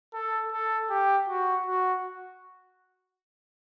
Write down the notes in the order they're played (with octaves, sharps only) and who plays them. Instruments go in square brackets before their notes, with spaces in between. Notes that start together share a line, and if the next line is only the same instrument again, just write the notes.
[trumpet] A4
A4
G4
F#4
F#4